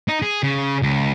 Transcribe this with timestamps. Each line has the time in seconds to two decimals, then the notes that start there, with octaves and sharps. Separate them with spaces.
0.09 D#4
0.22 G#4
0.43 C#3
0.82 C#2